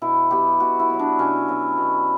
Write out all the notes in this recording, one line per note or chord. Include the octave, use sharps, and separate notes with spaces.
B2 E4
F#3 B3 G4
B2 F#4
E4
F#3 B3
D4
B2 C#4
F#3 B3
B2